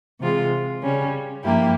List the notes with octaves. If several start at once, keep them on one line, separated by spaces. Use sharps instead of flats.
C3 E3 G#3 C4 F4
C#3 G3 C#4
G2 F3 A#3 E4 G4